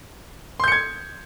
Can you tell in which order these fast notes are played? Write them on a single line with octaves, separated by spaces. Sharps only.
C6 G6 C#7 G#6